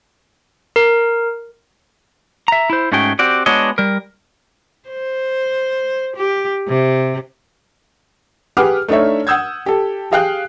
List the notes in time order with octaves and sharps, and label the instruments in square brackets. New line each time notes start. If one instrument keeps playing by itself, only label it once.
[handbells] A#4
[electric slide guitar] E5 A#5
E4 C5
G#2 A3 C#4 F#4 G#4 G5
C4 F#4 G4 D5
G#3 B3 D4 F#4 C#5 D#5
G3 A#4
[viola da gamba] C5
G4
C3
[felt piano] G4 G#4 B4 F#5 D6 F6
A3 D4 D#4 C#5 E5
F#5 D#6 E6 G6 G#6
G4 A4
G4 G#4 F5 G5 D#6 F#6